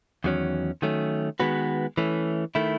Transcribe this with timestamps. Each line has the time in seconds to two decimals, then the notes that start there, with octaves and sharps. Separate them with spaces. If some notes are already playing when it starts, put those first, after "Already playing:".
0.24 E2 D#3 F#3 C#4
0.82 D#3 F#3 A3 C#4
1.40 D#3 G#3 B3 F#4 B4
1.98 E3 A3 C#4
2.55 D#3 A3 E4